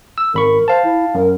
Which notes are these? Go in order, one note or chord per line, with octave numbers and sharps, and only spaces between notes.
E6
G#1 A#4 B5 C#6
C5 F5 A5
E4
F#2 A#4